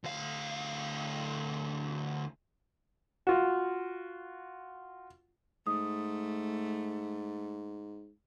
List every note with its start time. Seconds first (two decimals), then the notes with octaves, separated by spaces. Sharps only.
0.04 D2 F5
3.27 F4 F#4
5.67 G#2 A3 D#6